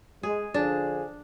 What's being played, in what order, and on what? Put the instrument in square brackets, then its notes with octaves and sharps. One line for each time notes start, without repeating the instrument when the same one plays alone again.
[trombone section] G#3 [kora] G#4
[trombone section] D3 F3 G#4 [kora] D4